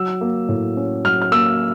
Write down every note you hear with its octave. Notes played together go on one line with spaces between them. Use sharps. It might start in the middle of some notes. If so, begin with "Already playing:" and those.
Already playing: F#3 E6
A#3
A2
C#4
F#3 F6
F6
A#3 E6